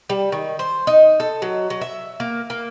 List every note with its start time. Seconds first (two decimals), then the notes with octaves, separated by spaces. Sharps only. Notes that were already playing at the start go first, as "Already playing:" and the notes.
0.10 G3
0.32 D#3
0.59 C5
0.87 D#4
1.20 A4
1.42 F#3
1.70 F#3
1.81 E5
2.20 A#3
2.50 A#3